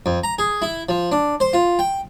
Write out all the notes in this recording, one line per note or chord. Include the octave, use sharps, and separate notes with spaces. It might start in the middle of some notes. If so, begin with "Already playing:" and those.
F2
A#5
G#4
E4
F3
D4
C5
F4
G5